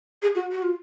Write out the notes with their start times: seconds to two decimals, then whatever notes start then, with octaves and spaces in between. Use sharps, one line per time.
0.22 G#4
0.35 F#4
0.52 F#4
0.62 F4